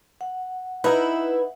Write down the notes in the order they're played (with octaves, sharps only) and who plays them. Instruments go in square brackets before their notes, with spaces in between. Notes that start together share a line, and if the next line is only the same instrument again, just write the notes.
[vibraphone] F#5
[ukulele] D#4 A#5 [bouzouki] E4 [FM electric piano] B4